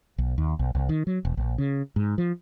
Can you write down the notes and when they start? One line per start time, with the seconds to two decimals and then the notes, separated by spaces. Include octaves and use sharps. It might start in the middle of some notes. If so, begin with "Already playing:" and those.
0.18 B1
0.38 D#2
0.59 B1
0.75 C2
0.89 D#3
1.07 F#3
1.25 E1
1.37 A#1
1.58 C#3
1.96 G#2
2.18 F3